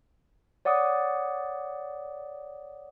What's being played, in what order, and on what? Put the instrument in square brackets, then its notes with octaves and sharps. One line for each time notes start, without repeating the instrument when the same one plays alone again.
[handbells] C#5 D5 F#5 D6 D#6